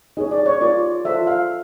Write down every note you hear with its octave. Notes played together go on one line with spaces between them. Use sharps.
D#4 G#4 C#5 D#5
D5
C#5
F4 A#4 C#5 D5
F4 A4 C5 E5
F5